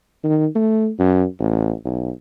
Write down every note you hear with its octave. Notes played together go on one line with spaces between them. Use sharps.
D#3
A3
F#2
A1
B1